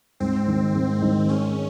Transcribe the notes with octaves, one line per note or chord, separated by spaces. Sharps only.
G#2 C4
D#3
G#2
D#3
G#3 C#4